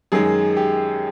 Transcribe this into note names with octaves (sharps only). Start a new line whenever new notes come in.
F#2 D#3 G#3 G#4
G4